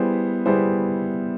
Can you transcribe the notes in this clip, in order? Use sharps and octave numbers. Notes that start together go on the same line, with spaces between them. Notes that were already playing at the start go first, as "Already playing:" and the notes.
Already playing: G3 B3 E4 G#4 C5
G3 B3 E4 G#4 C5